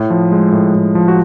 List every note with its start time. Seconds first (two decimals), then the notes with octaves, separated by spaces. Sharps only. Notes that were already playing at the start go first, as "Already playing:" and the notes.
Already playing: A2
0.10 F3
0.32 G#3
0.52 A2
0.75 A2
0.95 F3
1.08 F#4